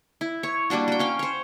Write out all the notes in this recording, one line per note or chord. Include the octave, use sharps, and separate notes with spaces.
E4
C#5
G3 A#3 D4 F#4
F#4 G5
C#4 F5 G5
C5 C#5